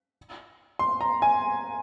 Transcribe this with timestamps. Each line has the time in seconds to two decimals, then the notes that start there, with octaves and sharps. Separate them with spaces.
0.79 C6
1.01 A#5
1.22 G#5